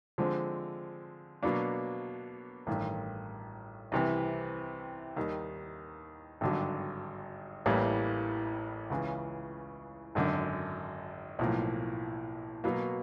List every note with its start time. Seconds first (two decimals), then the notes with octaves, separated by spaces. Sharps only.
0.18 D3 F3 G#3 C4
1.43 B2 F#3 A#3 D4
2.67 A1 G2 D#3
3.92 C2 C3 E3
5.17 D#2 D#3 G3
6.41 G#1 G2 D3 F#3
7.66 A1 A2 E3 G3 A#3
8.90 C#2 C#3 E3
10.15 G#1 F#2 D3
11.39 B1 A2 F3 A#3
12.64 B2 F#3 A#3